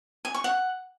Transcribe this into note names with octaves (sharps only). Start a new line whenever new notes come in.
G#5
C#6
F#5